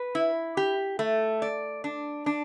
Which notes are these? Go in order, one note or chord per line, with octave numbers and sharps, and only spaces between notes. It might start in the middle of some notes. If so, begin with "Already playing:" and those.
Already playing: B4
E4
G4
A3
D5
D4
D4